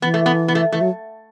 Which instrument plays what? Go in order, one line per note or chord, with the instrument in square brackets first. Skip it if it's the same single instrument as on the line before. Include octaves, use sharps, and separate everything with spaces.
[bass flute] E3 [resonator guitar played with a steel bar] B3
[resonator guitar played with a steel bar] A3
B3
B3
A3
[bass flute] E3 [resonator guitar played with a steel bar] A3
[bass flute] F#3